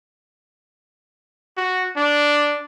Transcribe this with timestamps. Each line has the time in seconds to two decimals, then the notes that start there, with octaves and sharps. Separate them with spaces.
1.57 F#4
1.97 D4